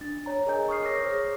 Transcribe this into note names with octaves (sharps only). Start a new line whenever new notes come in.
D4 A6
C#5 A#5
G#4 A#4 D#5 G#5 G6
C#6 D#6 F6 C7
A#4 C#5 D6 E6 A#6
G#4 C5 C#5